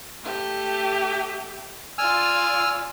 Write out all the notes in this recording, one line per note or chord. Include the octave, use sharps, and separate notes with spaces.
A3 G4
F4 D5 G#5 E6 F6